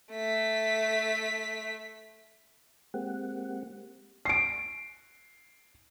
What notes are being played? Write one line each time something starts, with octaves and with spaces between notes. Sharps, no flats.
A3 B6
G#3 A#3 C4 G4 F#5
C7 D7